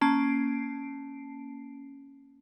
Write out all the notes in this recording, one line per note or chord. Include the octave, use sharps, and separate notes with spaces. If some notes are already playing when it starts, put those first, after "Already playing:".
A#3 C#4 A5 C7 D7